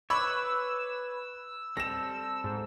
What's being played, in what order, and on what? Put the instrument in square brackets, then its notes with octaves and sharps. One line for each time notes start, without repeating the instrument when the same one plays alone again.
[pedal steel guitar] B4 C#5 [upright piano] B5 C#6 D6 [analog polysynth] E6
[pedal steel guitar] G3 C4 A4 [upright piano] A#6 E7
[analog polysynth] G#2